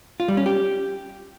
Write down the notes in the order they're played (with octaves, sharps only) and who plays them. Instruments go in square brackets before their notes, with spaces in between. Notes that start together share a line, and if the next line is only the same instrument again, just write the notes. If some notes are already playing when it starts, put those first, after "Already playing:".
[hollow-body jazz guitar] F4
G3
C#4
G4